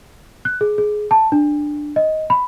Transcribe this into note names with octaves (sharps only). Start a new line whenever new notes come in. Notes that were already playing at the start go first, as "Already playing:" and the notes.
F#6
G#4
G#4
A5
D4
D#5
B5